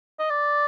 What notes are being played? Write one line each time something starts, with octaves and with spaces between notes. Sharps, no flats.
D#5
D5